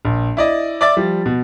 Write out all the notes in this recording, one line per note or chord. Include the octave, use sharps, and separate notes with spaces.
A#1
E4 D5 D#5
D5 E5 D6 A6
F3 G3
B2